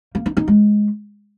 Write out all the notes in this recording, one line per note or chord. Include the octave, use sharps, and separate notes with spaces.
A#3
D#4
D#4
G#3